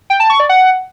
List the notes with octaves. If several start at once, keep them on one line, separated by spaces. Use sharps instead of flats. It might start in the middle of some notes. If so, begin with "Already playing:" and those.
G5
A5
C#6
D5
F#5